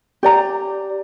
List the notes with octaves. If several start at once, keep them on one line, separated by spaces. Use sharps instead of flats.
G4 D5 A#5